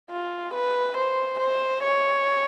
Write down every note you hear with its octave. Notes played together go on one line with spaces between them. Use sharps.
F4
B4
C5
C5
C#5